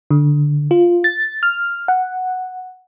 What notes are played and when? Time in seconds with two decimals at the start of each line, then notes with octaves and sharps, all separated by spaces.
0.11 D3
0.71 F4
1.04 A6
1.43 F6
1.88 F#5